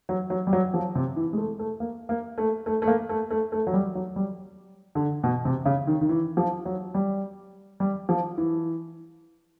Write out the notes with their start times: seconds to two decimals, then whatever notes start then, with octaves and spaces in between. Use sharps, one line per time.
0.09 F#3
0.30 F#3
0.47 G3
0.53 F#3
0.74 F3
0.95 C3
1.16 E3
1.33 G#3
1.37 A3
1.59 A3
1.80 A#3
2.09 A#3
2.38 A3
2.66 A3
2.82 A3
2.87 A#3
3.09 A3
3.31 A3
3.52 A3
3.67 F#3
3.73 G3
3.95 F#3
4.16 G3
4.95 D3
5.24 B2
5.45 C3
5.66 C#3
5.87 D#3
6.01 D#3
6.09 E3
6.37 F3
6.65 F#3
6.95 G3
7.80 G3
8.09 F3
8.38 E3